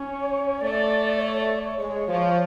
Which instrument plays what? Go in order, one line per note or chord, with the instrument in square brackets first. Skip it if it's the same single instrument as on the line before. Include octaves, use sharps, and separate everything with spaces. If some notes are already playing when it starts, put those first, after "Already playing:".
Already playing: [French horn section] C#4 [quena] C#5
[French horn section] A3 [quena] D5
[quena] C#5
D5
C#5
[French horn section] G#3 [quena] C#5
[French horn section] F3